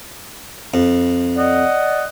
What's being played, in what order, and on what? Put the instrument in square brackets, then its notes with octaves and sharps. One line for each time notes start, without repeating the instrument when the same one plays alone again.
[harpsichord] F2
[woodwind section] D5 D#5 F#5